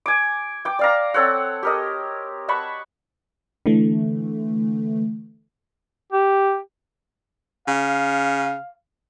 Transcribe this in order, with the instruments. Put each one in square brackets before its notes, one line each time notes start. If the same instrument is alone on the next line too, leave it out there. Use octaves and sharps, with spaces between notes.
[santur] G#5 D6
G5 D6
D5 F5 A#5
C4 A4 C#5 F#5
G4 A#4 D#5
F#5 A5 B5 C#6
[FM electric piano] D3 E3 A3
[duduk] G4
[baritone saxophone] C#3 [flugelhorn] F5